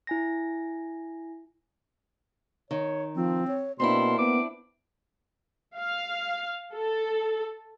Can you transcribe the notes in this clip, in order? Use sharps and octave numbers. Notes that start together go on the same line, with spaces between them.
E4 G#5 A#6
D#3 C#5
F3 C4
C#5
B2 A#3 C4 D4 E4 C6
B3 D6
F5
A4